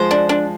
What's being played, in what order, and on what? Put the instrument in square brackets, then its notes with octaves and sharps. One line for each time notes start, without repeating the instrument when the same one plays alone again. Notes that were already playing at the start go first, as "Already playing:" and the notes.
Already playing: [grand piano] F3 G#3 [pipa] C5
[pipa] D4
D4